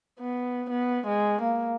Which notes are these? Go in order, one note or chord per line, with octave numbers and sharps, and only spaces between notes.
B3
B3
G#3
A#3